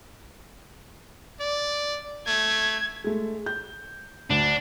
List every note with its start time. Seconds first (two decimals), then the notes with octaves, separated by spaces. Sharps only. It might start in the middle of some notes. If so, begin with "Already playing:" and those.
1.40 D5
2.27 A3 G#6
3.04 G#3 A3
3.46 G6
4.30 D2 D4